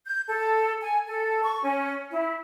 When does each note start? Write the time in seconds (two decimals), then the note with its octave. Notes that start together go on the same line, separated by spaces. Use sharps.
0.06 G6
0.27 A4
0.81 G#5
1.06 A4
1.43 C#6
1.62 C#4
2.10 E4